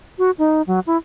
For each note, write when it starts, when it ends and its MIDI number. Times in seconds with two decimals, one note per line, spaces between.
0.19 0.31 66
0.38 0.62 63
0.67 0.80 54
0.87 0.97 64